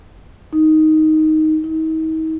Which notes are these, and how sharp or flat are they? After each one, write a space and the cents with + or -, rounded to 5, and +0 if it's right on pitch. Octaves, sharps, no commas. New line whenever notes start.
D#4 +5
D#4 +40